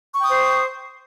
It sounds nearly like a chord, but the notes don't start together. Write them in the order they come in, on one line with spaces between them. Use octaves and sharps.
C#6 G5 D#6 C5